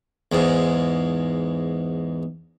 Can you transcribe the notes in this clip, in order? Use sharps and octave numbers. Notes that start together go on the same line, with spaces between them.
E2 G#2